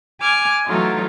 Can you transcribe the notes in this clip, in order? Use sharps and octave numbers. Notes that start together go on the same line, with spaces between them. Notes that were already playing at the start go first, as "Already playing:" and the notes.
G#5 D6 F6 G#6
E3 F#3 A3 D#4 F4